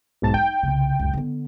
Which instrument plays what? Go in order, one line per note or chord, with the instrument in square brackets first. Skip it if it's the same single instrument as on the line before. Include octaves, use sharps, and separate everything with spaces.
[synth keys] B1 G#2 A5
[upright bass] D#4 [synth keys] G5
[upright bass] C2 C#3
C#2 F#2
D3 B3